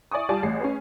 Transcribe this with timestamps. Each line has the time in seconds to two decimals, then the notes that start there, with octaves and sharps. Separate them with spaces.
0.11 E4 D5 G#5 C#6 D#6
0.29 G3 F4 D5 G#5 A5
0.43 A1 G#4 C7
0.60 C#4 G#4 B4